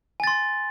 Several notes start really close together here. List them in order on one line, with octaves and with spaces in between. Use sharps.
G#5 A6 C6